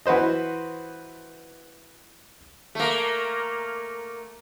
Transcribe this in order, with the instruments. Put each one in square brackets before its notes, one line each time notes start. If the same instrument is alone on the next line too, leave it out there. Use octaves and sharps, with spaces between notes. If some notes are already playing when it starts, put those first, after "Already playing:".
[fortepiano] E3 F#4 B4 C5 D#5
[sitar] A3 A#3